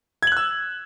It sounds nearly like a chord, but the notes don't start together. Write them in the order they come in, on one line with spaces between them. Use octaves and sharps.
G#6 F#7 F#6 E6